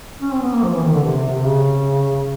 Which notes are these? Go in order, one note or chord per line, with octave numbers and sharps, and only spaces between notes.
C#4
C4
B3
A#3
F3
E3
D#3
D3
C3
C3
C#3